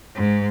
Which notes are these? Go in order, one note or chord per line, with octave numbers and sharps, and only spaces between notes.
G#2